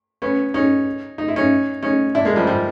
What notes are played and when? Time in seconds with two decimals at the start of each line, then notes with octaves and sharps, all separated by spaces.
0.22 B3 C#4
0.54 C#4 D#4
1.18 D#4
1.28 E4
1.36 C#4 D#4
1.83 C#4 D#4
2.15 D4 E4
2.25 G#3 A#3
2.36 F3 G3
2.47 F3 G3